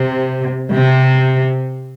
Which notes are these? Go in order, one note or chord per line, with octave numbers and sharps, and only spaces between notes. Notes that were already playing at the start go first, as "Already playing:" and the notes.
Already playing: C3
C3